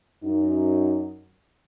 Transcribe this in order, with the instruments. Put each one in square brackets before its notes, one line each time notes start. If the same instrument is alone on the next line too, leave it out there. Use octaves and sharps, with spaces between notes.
[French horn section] F#2 D#4